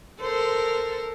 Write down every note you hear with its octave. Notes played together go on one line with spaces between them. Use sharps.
A4 A#4 C5